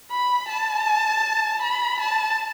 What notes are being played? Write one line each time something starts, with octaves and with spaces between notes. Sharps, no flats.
B5
A5
B5
A5